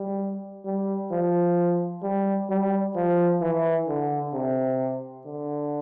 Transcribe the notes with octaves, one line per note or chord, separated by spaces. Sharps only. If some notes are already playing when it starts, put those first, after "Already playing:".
Already playing: G3
G3
F3
G3
G3
F3
E3
D3
C3
D3